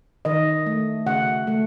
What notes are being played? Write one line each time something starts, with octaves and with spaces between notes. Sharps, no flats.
D#3 D#5
A3
C#3 F#5
A3